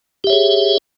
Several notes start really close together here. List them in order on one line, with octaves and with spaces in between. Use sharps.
G4 E5 C#5 G#4